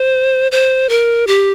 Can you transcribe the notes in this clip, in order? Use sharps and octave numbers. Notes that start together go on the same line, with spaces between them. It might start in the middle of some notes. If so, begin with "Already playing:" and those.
Already playing: C5
C5
A#4
G4